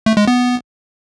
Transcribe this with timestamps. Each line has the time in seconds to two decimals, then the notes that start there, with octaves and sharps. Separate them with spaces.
0.06 A3
0.17 G#3
0.28 B3